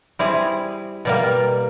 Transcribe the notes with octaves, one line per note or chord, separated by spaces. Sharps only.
G3 C4 E4 G#4
B2 G3 A#3